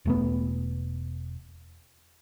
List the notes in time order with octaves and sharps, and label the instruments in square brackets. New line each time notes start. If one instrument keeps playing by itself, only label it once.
[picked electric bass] E1 A3 B3